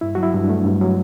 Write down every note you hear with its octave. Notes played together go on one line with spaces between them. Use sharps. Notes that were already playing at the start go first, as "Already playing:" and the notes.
G2 E4
F#3 F#4
E4
G2
D4
A3
G2
F#3